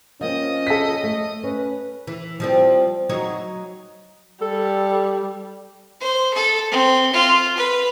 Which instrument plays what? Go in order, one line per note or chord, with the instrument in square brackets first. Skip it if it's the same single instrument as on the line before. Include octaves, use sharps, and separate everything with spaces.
[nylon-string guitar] F3 A#3 C4 [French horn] C#4 [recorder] D#5
[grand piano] A4 B6
[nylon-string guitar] A3
[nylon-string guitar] C#4 [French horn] B4
[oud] E3
F3 G3 C4
F#3 D#4 C#5
[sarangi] G3 [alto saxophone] A4
[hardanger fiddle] C5
A4
C4
F4
B4